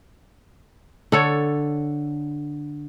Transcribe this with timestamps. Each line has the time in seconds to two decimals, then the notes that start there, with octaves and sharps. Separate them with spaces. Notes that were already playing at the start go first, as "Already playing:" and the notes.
1.12 D3 A4 C#5